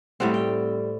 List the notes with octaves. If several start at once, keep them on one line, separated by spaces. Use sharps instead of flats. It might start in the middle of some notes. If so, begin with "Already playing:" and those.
A2 G3 C4 F#5
G5